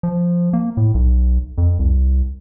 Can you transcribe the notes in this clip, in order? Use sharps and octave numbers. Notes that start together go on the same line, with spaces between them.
F3
A#3
A2
B1
F2
C2